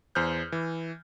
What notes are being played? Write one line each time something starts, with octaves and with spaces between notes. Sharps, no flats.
E2 C5 F6 G6
E3